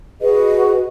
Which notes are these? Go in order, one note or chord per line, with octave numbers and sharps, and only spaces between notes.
F#4 G#4 B4 D#5